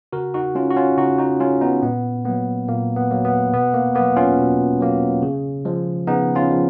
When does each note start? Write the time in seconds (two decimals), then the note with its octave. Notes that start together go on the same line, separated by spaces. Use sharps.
0.13 C#3 F#4 A#4
0.34 D#4 F#4
0.55 G#3 C#4 F4
0.70 F#4
0.76 C#4 F4
0.97 C#3 D#4 F#4
1.19 D#4 F#4
1.40 G#3 C#4 F4
1.61 B3 D#4
1.82 A#2 B3
2.25 F#3 A#3 B3
2.68 A#2 A#3
2.96 B3
3.11 F#3 A#3
3.25 B3
3.53 B2 B3
3.74 A#3
3.95 F#3 A#3 B3
4.16 C#4 F4
4.38 B2
4.81 F#3 A#3
5.22 C#3
5.65 F3 G#3
6.07 C#3 B3 D#4
6.35 C#4 F4
6.50 F3 G#3